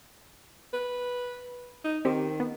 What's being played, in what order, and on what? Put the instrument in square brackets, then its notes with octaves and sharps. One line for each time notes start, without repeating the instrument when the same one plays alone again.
[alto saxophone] B4
D#4
[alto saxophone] D#3 [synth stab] C4 G4
[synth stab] B3